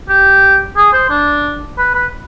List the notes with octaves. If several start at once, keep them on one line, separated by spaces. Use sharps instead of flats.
G4
G#4
C5
D4
B4
B4